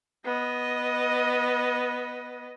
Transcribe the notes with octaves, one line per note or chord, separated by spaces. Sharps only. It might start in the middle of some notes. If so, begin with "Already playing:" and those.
B3 D#5